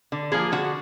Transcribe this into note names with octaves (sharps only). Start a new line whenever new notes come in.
D3
F3 A#3 G#4
D3 F#4